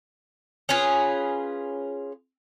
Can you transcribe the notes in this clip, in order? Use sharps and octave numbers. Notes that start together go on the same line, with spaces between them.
C#4 F4 G#4 B4